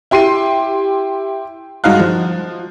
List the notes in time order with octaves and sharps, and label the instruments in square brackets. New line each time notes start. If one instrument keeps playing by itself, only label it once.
[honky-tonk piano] E4 G4 C6 C7 D#7
G2 G#3 D#4 F#4 F5 F#6
F3